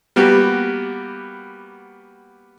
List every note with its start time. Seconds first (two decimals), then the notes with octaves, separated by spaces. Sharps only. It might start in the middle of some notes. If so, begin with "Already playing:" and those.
0.16 G3 A#3 B3 F#4 G4